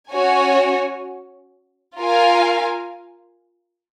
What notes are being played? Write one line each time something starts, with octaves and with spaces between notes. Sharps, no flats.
C#4 F#4 C#5 G#5
F4 A#4 F5 G#5